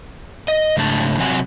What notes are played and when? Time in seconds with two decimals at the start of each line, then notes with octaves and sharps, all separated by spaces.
0.48 D#5
0.77 G#2 C#3 A3 D4 A5
1.20 C3 F#3 C4 F#5 G#5